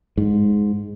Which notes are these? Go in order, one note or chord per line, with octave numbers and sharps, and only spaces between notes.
G#2